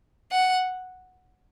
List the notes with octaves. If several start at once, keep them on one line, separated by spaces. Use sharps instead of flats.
F#5